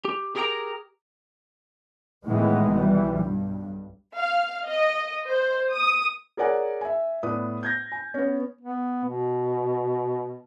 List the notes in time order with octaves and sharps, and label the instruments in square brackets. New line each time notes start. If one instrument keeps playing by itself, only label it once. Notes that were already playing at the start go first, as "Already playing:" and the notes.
[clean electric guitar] G4
G4 G#4 A#4 G5 A#5
[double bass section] A2 D#3 E3 G#3 B3
B1 E3 G3
B1 G2
[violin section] F5
D#5
C5
D#6
[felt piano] G#4 A#4 C#5 D5 F#5 G#5
E5 G#5
A2 B3 B4 D5 D#6
G6 G#6 A#6
G#5
B3 C#4
[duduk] B3
B2